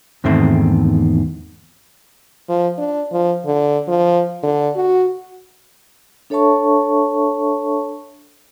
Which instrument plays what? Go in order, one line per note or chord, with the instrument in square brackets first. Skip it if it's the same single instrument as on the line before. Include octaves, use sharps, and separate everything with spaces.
[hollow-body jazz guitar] E2 G#2 D#3 A3 C4 E5
[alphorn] F3
D4
F3
D3
F3
D3
F#4
[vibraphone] D4 A4 C#5 E5 A5 C#6